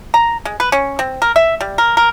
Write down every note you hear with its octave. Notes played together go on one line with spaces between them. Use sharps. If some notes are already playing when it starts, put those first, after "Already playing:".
A#5
G#3
B4
C#4
C4
A#4
E5
G3
A#4
A#4